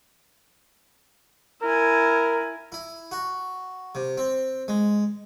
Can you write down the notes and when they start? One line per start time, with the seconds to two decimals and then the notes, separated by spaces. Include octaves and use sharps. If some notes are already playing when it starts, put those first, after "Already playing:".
1.62 E4 A#4 G#5
2.72 E4
3.12 F#4
3.95 C3
4.18 C4
4.68 G#3